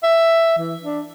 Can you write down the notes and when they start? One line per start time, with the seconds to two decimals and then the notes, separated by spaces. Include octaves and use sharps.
0.03 E5
0.58 E3
0.82 D4